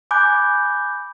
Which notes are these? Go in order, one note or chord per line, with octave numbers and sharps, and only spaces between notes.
G#5 B5 D6 F#6 G6